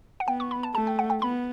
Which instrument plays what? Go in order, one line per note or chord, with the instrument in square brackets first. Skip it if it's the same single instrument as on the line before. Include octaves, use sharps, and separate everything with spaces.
[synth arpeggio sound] F#5
[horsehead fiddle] B3 [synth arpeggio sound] G5
[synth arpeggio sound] C#6
B5
A5
[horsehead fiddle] A3 [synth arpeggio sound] A5
[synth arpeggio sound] G5
F#5
G5
[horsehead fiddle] B3 [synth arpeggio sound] B5